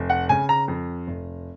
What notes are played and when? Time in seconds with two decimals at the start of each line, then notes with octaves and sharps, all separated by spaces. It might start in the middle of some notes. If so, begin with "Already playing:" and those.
Already playing: F1
0.10 F#5
0.29 C#3 G#5
0.49 A#5
0.68 F2
1.08 F1